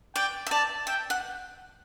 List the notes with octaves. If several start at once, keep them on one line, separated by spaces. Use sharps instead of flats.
D5 G5
E5
D5 A5
E5 G5
F#5